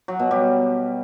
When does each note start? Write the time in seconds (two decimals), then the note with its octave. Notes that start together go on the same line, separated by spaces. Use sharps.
0.08 F#3
0.20 B2
0.31 G3